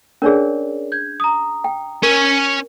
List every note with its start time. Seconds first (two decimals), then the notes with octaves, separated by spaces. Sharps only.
0.22 C#4 D4 G#4 A#4 C#5 D5
0.92 G6 G#6
1.20 A#5 D#6
1.64 G5
2.03 C#4 A#4 G#5